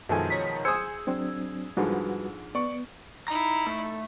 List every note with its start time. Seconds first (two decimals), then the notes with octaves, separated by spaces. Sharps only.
0.09 F#2 B2 D#3 F3 G#3 A4 G#5
0.30 C#5 A#5 B6
0.65 G#4 C5 G#5 D#6 E6 G#6 C#7
1.07 F#3 C4 D4
1.77 G#2 D3 F3 G3 F#4 B4
2.55 B3 D5 C#6
3.28 D#4 E4 A#5
3.66 A3